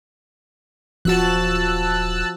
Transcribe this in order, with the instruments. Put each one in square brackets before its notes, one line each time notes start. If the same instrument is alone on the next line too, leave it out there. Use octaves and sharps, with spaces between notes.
[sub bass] D#1 [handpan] F3 F#4 [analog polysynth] A5 E6 F#6